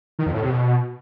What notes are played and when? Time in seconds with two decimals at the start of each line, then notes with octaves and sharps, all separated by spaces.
0.19 D#3
0.26 F2
0.34 A2
0.42 C3
0.50 B2